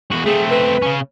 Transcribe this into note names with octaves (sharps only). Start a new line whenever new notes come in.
E2 F#4
A3 C4 G#4
B4
C#3 C#4